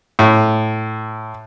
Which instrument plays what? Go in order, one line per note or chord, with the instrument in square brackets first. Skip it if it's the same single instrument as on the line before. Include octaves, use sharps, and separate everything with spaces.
[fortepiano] A2